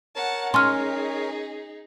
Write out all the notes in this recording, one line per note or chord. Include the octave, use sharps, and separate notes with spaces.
A#4 C#5 F#5 A5
C#4 D#4 G#4 C6 F6